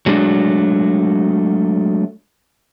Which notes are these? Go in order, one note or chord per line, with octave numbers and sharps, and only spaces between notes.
F#3 G#3 A3 D4 F#4